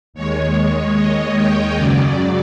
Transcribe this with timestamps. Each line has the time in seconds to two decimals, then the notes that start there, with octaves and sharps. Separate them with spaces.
0.14 D#2 D#3 G#3 C#5
0.95 D#5
1.35 G5
1.75 F#2 C#3 F#3 D5